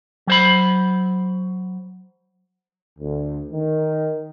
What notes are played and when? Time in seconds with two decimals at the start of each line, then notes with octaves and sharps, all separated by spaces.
0.27 F#3 C5 B5
2.99 D2
3.53 D#3